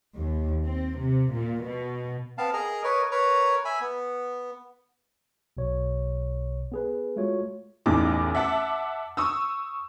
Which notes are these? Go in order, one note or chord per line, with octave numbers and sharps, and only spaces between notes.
D#2
C4
C3
A#2
B2
B3 C4 F5 A5
G#4 A#4 D#5 A#5
A#4 B4 C#5 D#5
A#4 B4 C#5 A#5
E5 G#5 B5
B3
B1 B2 C#5
B3 G#4 B4
G#3 A3 F4 F#4 C#5
A1 E2 D#4 D6
E5 F#5 A5 D6
C#6 D#6 E6